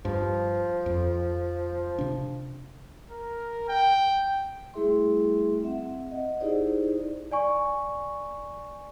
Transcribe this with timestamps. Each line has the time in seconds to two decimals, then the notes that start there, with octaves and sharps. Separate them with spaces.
0.05 G2 F3
0.86 F2
1.99 C3 D4
3.11 A#4
3.69 G5
4.74 G3 A3 E4 G#4 E5 C6
5.63 C4 E5 F#5
6.11 D#5 F#5
6.40 D#4 E4 G4 G#4 C5 D5
7.31 D5 G#5 C#6